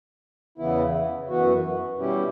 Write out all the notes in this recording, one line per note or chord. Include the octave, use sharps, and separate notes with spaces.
E2 C#3 E3 B3 E4
F#2 E3 B3 F#4
B2 G3 C#4 E4 G4